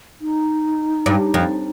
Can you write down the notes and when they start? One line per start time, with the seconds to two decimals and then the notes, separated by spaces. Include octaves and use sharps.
0.21 D#4
1.06 G2
1.34 F2